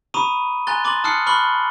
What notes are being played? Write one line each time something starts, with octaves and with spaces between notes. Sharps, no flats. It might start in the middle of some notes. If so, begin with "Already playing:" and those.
A#5 B5 C#6 D#6 D#7
G#5 A#5 C6 F#6 A6 G7
C6 D6 A6 F#7
A5 D#6 F6 F#6 C7 C#7
B5 C#6 F6 F#6 F#7 G7